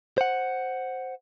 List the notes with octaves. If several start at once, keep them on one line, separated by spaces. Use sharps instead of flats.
C5 F#5